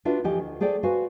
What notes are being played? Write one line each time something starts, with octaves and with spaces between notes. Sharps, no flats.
D4 F4 F#4 B4 E5
D2 E3 F3 G4 D#5 G#5
D2
A3 G#4 C5 D5 G5
F#4 B4 C5 F5 G#5